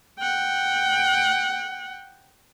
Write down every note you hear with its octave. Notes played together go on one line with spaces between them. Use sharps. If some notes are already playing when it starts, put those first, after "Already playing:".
F#5 G5